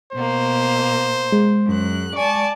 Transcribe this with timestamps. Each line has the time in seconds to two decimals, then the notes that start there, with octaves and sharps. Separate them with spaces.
0.13 B2 A#3 C5
1.32 G#3
1.66 F#2 F#6
2.16 D5 G#5 A5 C#6